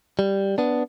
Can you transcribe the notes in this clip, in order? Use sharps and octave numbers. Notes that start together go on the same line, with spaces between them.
G3
B3 D4